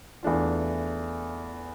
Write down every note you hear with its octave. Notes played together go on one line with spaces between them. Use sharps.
E2 E3 A3 D4 F4